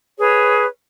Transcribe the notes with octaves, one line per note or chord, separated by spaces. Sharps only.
G#4 B4 C#5